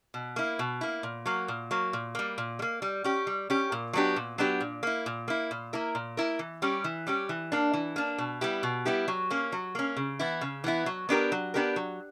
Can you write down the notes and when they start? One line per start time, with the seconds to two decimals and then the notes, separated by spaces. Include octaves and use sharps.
0.14 B2
0.36 A#3 E4
0.59 B2
0.81 A#3 E4
1.03 A#2
1.26 F#3 A#3
1.48 A#2
1.71 F#3 A#3
1.93 A#2
2.15 G3 A#3
2.38 A#2
2.59 G3
2.62 A#3
2.82 G3
3.04 C#4 G4
3.27 G3
3.50 C#4 G4
3.72 A#2
3.93 F#3 B3 D4 G4
4.16 A#2
4.38 F#3 B3 D4 G4
4.60 A#2
4.83 A#3 E4
5.06 A#2
5.28 A#3 E4
5.51 A#2
5.73 A#3 E4 A#4
5.95 A#2
6.17 A#3 E4 A#4
6.39 E3
6.62 G3 C#4 G4
6.84 E3
7.07 G3 C#4 G4
7.29 E3
7.52 A#3 D4
7.74 E3
7.96 A#3 D4
8.18 B2
8.41 G3 B3 E4 G4
8.63 B2
8.85 G3 B3 E4 G4
9.08 F#3
9.30 A#3 C#4
9.52 F#3
9.75 A#3 C#4
9.97 C#3
10.19 E3 B3 E4
10.41 C#3
10.64 E3 B3 E4
10.86 F#3
11.09 B3 D4 G4 A#4
11.32 F#3
11.54 B3 D4 G4 A#4
11.76 F#3